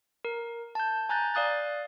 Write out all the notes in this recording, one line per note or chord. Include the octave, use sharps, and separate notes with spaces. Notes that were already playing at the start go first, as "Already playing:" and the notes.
A#4
A5 G6
G#5 A#5 F#6 G6 A6
D5 F5 D#6 F#6 A6